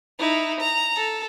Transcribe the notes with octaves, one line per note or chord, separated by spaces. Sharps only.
D#4 E4
A#5
A4